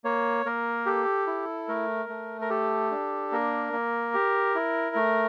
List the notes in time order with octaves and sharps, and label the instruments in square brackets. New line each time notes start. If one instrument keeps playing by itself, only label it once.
[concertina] A#3 C#5
A#3 A#4
G4 A4
E4
A3 A#4
A3
A#4
G4 A4
D4
A#3 A#4
A#3
G4
E4
A3